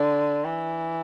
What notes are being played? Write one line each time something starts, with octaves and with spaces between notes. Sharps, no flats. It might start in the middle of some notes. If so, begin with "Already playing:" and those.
Already playing: D3
E3